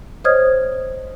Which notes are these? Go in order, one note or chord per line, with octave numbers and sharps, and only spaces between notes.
C5 C#5 D#5 D#6 F6 G#6